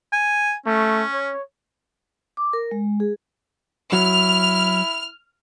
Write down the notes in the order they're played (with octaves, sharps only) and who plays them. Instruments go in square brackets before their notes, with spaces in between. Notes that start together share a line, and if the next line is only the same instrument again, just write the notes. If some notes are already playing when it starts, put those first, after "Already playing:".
[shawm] G#5
[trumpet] A3 [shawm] C#4
[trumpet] C#5
[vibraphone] D6
A#4
G#3
G#4
[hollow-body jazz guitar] F#3 [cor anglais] E4 [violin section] F6